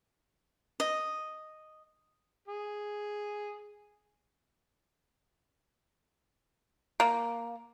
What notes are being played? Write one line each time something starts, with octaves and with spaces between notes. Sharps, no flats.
D#5
G#4
A#3